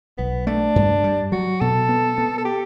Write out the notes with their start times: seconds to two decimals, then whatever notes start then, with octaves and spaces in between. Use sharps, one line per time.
0.18 B1 B3
0.47 A3 D4
0.76 G2
1.04 G3
1.32 F#3 F#4
1.61 B2 A4
1.89 B3
2.18 B3
2.38 A4
2.45 G4